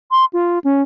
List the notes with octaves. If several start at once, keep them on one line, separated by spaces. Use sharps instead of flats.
C6
F4
C#4